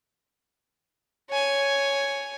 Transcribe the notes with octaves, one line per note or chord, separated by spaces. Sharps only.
C#5 G#5